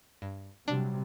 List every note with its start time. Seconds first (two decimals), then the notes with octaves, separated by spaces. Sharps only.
0.22 G2
0.68 C3 F#3 G3 D4